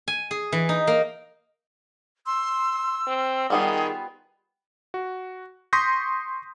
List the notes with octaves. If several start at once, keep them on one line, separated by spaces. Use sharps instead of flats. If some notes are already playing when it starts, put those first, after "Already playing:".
G#5
G#4
E3
D#4
A#3
C6 E6
C4
D#3 G3 B3 F4 G#4
F#4
C6 C#6 D#6 G6 A#6 B6